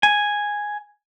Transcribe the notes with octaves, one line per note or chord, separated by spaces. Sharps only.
G#5